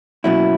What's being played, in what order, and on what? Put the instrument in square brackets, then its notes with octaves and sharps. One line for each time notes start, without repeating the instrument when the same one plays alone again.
[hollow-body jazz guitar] B2 F#3 A#3 C#4 E4